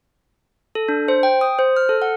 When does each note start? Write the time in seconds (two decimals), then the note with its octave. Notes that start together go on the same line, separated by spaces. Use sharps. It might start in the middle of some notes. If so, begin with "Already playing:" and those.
0.75 A4
0.89 D4
1.08 C5
1.23 G5
1.41 D#6
1.59 C5
1.76 F6
1.89 A4
2.02 F#5